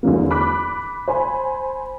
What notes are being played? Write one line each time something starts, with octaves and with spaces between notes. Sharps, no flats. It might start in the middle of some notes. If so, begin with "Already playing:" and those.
E2 D3 F#3 A#3
B5 D6 F#6 B6
C5 G#5 B5